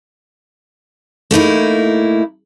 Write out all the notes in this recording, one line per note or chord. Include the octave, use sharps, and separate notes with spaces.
A3 A#3 D#4 E4